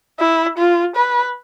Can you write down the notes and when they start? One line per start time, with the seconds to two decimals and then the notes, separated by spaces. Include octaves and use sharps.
0.20 E4
0.58 F4
0.96 B4